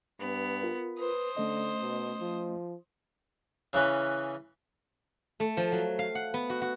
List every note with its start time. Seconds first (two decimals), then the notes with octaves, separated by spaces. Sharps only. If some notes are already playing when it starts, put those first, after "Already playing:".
0.20 G2 B3
0.62 F4 A#4
1.00 B4 C5 D#6
1.37 D3 A3 C#4 D#5
1.81 B2
2.20 F3
3.73 C#3 E3 C#4 B4
5.40 A3
5.57 F3
5.72 F#3
5.99 F5
6.15 F#5
6.34 B3
6.50 F#4
6.62 F#4